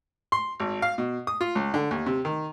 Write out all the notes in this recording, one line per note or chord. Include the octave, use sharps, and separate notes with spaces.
C6
G#1
F5
B2
D#6
F4
C#2
D3
D#2
C3
D#3